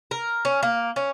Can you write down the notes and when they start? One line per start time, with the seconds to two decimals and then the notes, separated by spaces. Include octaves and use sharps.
0.11 A#4
0.45 C#4
0.63 A#3
0.96 C#4